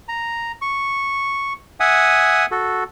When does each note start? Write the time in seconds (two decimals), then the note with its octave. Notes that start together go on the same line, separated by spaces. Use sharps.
0.08 A#5
0.62 C#6
1.80 E5 F#5 G#5 D#6
2.51 F#4 A4